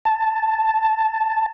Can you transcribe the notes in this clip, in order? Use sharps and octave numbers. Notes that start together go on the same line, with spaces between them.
A5